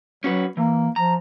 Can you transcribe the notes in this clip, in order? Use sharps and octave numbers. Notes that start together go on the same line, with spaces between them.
F#3 C#4 F#4 B4
E3 A#3
F3 A#5